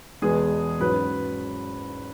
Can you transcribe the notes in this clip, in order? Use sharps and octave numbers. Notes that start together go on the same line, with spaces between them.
E2 B2 G#3 B3 G#4
G#2 F#3 C#4 B4